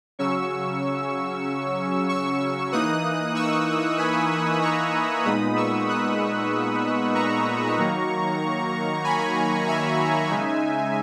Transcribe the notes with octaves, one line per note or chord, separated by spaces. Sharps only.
C#3 F#3 C#4 C#6 E6
C#6 E6
E3 A#3 D#4 D#6 F#6
C#6 E6
G#5 B5
A#5 C#6
A#2 G#3 B3 D#4 B5 D#6
C#6 E6
D#6 F#6
A#5 C#6
D#3 F#3 A#3
G#5 B5
E5 G#5
C#3 G#3 D#4